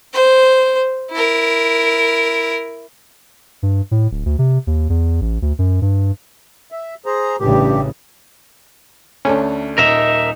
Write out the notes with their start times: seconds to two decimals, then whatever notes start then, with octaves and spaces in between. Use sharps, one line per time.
0.14 C5
1.11 E4 A#4
3.63 G2
3.91 A2
4.11 D1
4.26 D2
4.39 C3
4.67 D#2
4.90 E2
5.21 A1
5.42 D2
5.59 F#2
5.82 G2
6.72 E5
7.06 G#4 C5 A#5
7.40 A1 G2 C#3 G4
9.25 D2 A3 C#4 D4
9.78 D#1 D#4 A#4 E5 F7